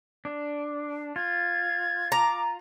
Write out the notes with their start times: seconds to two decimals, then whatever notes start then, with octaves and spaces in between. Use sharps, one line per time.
0.25 D4
1.16 F4 G#6
2.12 A#5 D6